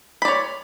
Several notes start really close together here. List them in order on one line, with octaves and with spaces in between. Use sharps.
B5 D5 C#5